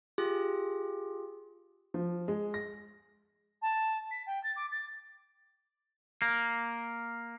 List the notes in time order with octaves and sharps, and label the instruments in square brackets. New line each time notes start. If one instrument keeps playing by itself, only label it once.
[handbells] F4 G4 G#4
[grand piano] F3
G#3
A#6
[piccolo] A5
B6
G5
A6
D6
A6
[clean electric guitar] A#3